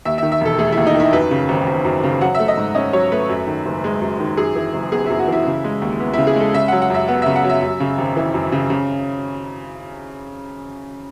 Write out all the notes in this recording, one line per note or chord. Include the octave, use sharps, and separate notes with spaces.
D#2 E5
E5
D#3
E5
E1 A4
A3 G#4
E4
D#2
D#4
D#3
E4
F#2 B4
C#3
G#1
G#1
F#2
C#3
F#3 F#5
E5
A3
D#5
G#2
C#4 D#5
F#3 C#5
A3 B4
F#2
D#3
F#1
G#3
F#2
D#3
F#2 G#4
E3
F#1
B3 G#4
F#2 E4
F#4
E3 E4
C#3
G#3
D#2
B3
E4
C#3
G#4
G#3 A4
C#3 E5
F#3 F#5
F#5
F#2 E5
B3 F#5
C#3 E5
F#5
F#3
E5
F#2
C#3
G#1
E3
F#2
C#3
C#3